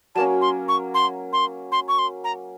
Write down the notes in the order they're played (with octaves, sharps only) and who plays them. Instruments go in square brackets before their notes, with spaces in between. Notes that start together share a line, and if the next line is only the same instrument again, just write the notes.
[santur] F#3 A#3 C#4 [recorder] A5
[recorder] C6
C#6
C6
C6
C6
C#6
C6
A#5